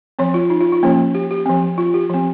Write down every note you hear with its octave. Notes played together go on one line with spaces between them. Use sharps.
F3 C4 C#5
F4
D#4
F4
F4
F3 A#3 C#4
G4
G4
F3 C4
F4
G4
F3 C4